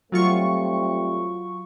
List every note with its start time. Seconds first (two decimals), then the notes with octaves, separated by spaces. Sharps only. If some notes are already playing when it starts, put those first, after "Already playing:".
0.12 F#3 G3 A3 C4 F4 C#6